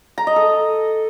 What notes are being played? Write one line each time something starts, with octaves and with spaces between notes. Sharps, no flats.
A#5
D#5
A4